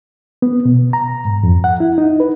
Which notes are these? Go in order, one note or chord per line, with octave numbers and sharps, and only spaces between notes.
B3
B2
A#5
G#2
F2
F#5
E4
D#4
B4